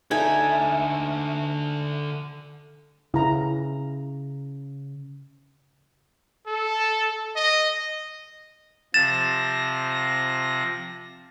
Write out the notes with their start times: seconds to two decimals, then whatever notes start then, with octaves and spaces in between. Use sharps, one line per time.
0.11 D3 D#4 A4 D5 E5 G#5
3.14 C#3 E4 A#5
6.47 A4
7.36 D#5
8.94 C3 F3 A6 A#6 E7